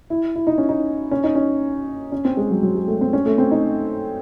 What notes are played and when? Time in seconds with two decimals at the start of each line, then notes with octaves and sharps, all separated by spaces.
0.10 E4
0.36 E4
0.47 D#4
0.58 C#4
0.69 D#4
1.11 C#4
1.24 D#4
1.35 C#4
2.12 C#4
2.25 C4
2.37 G#3
2.50 F#3
2.63 F#3
2.75 G#3
2.88 A3
3.01 C4
3.13 C#4
3.26 A3
3.38 C4
3.51 D#4